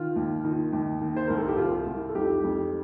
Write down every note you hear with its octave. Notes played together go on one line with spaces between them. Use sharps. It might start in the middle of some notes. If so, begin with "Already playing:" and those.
Already playing: D#3 F4
D#2
D#3 D#4
D#2
D#3
C5
C2 A#4
A4
G4
C2 F4
C2
A4
F2 D#4 G4
F2